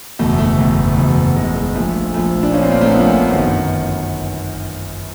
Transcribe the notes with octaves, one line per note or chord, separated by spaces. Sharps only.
F#1 E2 B2 A3
A3
F#1 E2 B2
F#1 E2 B2
F#1 E2 B2 G#3
G#3
A#1 A#2 F3 A3
A#1 A#2 F3 A3
D4
A#1 A#2 F3 C#4
C4
A#3
A3
A#1 A#2 F3 B3
A#3
B3
G1 F#2 D#3